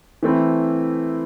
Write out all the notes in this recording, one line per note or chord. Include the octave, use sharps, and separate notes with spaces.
E3 A3 C4 E4